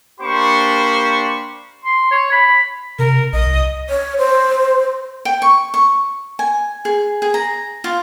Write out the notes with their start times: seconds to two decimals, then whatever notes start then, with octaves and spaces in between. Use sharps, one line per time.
0.21 A#3 D4 G4 C5 B5 C#6
1.85 C6
2.11 C#5
2.32 B5
2.99 C3 A#4
3.33 A#1 D#5
3.46 C2
3.90 C#5
4.18 C5
5.25 G5
5.42 C#6
5.74 C#6
6.39 G#5
6.85 G#4
7.22 G#4
7.34 A#5
7.84 F4